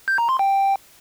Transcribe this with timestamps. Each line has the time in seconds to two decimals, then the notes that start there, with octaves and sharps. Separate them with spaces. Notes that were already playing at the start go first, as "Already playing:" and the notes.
0.08 G6
0.18 A#5
0.29 C6
0.39 G5